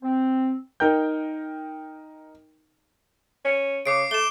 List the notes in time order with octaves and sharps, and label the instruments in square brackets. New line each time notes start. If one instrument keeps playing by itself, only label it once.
[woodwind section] C4
[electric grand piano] D#4 A#4 G5 G6
[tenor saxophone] C#4
[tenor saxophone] C#3 [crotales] D6 C7 D7
[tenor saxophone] A3 [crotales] E7 G7